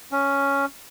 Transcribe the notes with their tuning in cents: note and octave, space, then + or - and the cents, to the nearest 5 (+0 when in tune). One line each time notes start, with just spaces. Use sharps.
C#4 +5